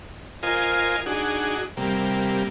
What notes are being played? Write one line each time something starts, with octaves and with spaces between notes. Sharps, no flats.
F4 A#4 C5 D#5 G#5
D4 D#4 F#4 G#4
C3 G3 A#3